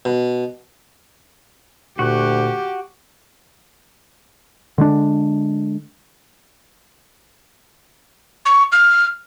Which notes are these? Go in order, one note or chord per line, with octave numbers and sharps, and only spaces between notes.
B2
D2 A#2 F#4 G4 C#6 F#6
D3 G#3 D4
C#6
F6